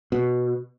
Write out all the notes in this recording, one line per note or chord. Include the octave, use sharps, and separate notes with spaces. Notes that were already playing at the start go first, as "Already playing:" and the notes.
B2